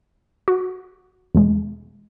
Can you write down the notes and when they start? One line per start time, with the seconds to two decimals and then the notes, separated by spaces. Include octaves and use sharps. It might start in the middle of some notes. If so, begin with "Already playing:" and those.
0.48 F#4
1.35 E2 B2 G#3